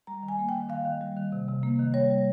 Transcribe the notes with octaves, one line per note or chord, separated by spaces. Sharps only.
G3 A#5
D#3
G#5
A#3
G5
D#3
D#3 F5
D#3
G3
D#3
C3
C3
A#3
D#3
G3 C#5
G3